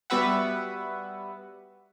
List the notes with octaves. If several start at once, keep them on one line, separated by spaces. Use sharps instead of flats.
G3 B3 F#4 B4 E5 F#5